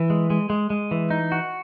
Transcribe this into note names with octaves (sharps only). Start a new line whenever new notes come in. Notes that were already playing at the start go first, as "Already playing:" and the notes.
Already playing: E3
G#3
G#3
G#3
G#3
E3
D#4
F#4